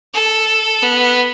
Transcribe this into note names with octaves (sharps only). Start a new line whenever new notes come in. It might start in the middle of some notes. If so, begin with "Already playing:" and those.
A4
B3